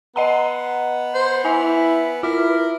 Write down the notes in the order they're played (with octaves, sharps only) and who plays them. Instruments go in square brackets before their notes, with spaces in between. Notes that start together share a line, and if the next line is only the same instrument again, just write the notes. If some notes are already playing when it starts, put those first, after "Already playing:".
[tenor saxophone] B3 [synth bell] D#5 F#5 A#5
[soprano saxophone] C5
[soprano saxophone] E4 [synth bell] G#5
[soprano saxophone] E4 [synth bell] F4 [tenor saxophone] A#4